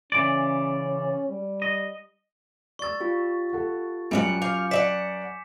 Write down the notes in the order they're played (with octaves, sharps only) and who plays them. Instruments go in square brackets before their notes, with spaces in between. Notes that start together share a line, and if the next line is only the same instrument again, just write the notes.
[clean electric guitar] C#3 E3 D5 [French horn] C#4
[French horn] G3
[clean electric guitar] D#5
[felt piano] D5 E6 [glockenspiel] C#6 A6
[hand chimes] F4 G4
[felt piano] A4 F#5
[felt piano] F#2 [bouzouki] G3 E5 F#5 [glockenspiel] G#5 C#7
[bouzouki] F5 [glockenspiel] D6 G6
[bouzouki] D5 E5 F#5 [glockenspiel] B6 E7